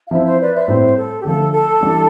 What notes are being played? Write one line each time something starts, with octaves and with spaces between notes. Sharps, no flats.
F5
F3 C4 E4 C5 E5
C5 E5
B4 D5
C5 E5
B4
A2 G3 C4 E4 C5
A4
G4
D3 F3 A3 A4
A4
E3 G3 D4